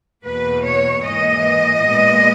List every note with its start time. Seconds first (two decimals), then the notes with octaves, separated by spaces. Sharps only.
0.24 E2 B2 A#3 B4
0.64 C#5
1.04 G#2 E3 A#3 D#5
1.86 A#2 G#3 B3